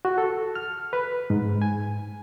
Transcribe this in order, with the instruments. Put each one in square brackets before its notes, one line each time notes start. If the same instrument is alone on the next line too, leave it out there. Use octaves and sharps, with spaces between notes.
[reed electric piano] F#4
A4
F6
B4
G#2
G#5